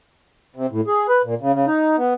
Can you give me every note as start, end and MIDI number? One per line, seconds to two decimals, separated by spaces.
0.56 0.66 48
0.71 0.81 45
0.87 1.07 68
1.09 1.22 71
1.24 1.35 46
1.41 1.53 49
1.53 1.66 49
1.67 1.96 63
1.98 2.14 59